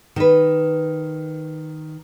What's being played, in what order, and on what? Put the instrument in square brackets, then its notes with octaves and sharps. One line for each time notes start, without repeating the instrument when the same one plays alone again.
[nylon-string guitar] D#3 B4